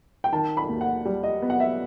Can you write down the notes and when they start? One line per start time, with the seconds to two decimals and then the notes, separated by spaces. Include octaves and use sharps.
0.24 G5
0.33 D#3 A5
0.57 B5
0.69 D#2
0.81 F#5
1.05 G3
1.23 D#5
1.42 B3
1.50 F#5
1.60 E5